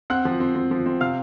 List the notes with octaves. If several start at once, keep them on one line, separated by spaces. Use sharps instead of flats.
C4 F#5 F#6
F3
C4
C4
F3
C4
C3 F5 F6